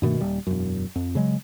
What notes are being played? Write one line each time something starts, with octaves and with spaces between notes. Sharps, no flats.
G2 B2 D#3 A3
D#1 G3
E1 F#2
F2
C#3 F#3 G#3